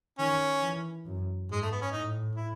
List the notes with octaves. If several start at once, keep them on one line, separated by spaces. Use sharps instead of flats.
D#3 C#4
E3
F#2
G#2 G#3
A3
B3
C#4
A2 D#4
E4